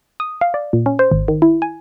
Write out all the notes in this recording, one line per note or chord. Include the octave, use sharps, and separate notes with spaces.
D#6
F5
D5
A#2
C#4
C5
G#1
D#3
E4
G#5